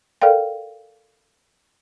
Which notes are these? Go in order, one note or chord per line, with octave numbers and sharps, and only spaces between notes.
A4 A#4 D5 F5 G5